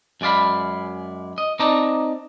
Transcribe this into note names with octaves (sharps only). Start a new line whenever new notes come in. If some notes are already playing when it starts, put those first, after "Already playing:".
F#2 G#3 D5 F5 B5
D#5
C4 D#4 D5 D#5 A5 A#5